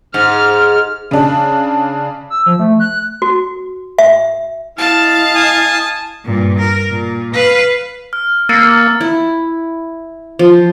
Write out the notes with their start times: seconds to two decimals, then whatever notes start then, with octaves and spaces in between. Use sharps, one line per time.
0.14 G#2 F6
1.11 C#3 D4
2.30 E6
2.46 F3
2.59 A3
2.80 F#6
3.22 F#4
3.98 E5
4.79 E4 D#5 F5 A5
5.35 G#5 D#6
6.26 G2 A#2
6.59 A#4
6.91 A#2
7.34 B4 F5
8.13 F6
8.49 A#3 E6 A6 C#7
9.01 E4
10.39 F3